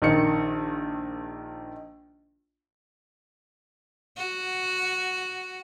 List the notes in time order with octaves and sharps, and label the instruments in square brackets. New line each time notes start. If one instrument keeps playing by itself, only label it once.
[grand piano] A#1 D#3 C#7
[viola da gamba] F#4